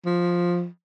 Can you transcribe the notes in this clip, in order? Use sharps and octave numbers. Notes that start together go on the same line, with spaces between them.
F3